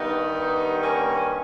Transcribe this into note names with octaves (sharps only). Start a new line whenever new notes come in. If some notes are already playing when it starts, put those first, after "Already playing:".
Already playing: G2 D#3 G3 B3 D#4
A#3 C#4